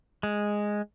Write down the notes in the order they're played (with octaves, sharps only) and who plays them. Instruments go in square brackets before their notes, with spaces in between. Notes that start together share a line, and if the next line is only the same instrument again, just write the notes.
[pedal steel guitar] G#3